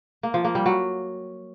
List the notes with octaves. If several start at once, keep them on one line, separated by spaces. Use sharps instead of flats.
A#3
F3
A#3
G3
F#3